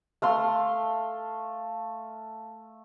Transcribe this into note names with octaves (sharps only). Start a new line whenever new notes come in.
A3 F5 C6